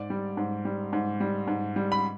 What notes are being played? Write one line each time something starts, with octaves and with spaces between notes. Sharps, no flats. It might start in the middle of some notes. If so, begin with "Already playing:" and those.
Already playing: G#2 D5
G3
G#2
G3
G#2
G3
G#2
G3
B5